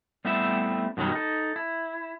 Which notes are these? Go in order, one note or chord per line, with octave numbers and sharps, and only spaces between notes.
G3 A3 B3 C4 E4 E5
F#2 B2 D#3 F#3 G3
D#4 A4
E4